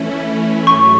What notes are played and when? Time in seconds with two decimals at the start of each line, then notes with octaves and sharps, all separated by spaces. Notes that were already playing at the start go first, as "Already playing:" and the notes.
Already playing: E3 A3 C#4 E4
0.67 G#2 F#3 A3 C#6